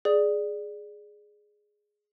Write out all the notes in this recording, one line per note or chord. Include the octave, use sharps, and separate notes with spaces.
G#4 D5